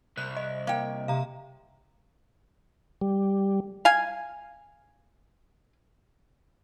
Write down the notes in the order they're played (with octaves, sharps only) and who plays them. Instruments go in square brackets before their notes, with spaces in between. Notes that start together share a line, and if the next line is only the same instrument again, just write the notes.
[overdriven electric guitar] C2 [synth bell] F#6
[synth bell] D#5
[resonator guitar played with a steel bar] A#3 G5
[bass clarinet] C3 [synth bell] F5 A#5
[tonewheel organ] G3
[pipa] F5 G#5